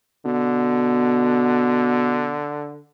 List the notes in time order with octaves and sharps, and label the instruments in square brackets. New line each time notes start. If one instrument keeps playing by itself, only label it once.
[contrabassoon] B2 [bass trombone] D3